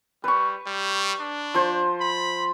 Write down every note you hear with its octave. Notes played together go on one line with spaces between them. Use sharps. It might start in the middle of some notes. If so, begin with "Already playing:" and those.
G3 B4 C#6
G3
D4
F3 C5
B5